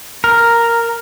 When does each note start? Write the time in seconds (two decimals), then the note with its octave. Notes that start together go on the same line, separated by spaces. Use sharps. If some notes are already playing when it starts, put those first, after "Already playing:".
0.24 A#4